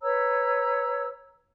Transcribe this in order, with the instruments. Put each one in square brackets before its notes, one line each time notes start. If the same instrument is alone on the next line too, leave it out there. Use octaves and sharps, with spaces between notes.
[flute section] B4 C#5 A#5 E6